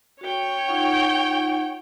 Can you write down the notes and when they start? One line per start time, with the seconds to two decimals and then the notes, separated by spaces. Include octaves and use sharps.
0.21 F#4 C#5 G5
0.67 D#4 F4 F#5